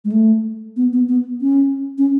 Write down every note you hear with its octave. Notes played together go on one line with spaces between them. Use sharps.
G#3
A3
B3
B3
B3
C#4
C#4